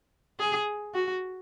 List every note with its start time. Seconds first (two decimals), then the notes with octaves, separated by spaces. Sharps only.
0.39 G#4
0.94 F#4